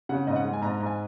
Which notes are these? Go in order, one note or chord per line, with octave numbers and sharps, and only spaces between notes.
C#3 F#5
G#2 D#5
F#5
G#3
G#5
G#2 A#5
A#5
G#2
G#5